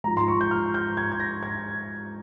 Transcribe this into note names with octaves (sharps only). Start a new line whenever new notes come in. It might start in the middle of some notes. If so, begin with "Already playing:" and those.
G#2 F3 G#3 A#5
C6
C#6
G6
F6
G6
G#6
G#6
A#6
G#6